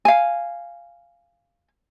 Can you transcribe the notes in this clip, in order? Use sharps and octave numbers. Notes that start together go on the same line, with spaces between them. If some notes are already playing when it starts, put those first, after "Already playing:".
F5 G#5